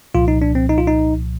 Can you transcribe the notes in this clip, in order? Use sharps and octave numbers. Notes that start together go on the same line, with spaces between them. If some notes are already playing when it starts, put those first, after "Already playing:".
C2 A#2 F3 F4
D#4
D4
C4
D#4
F4
D#4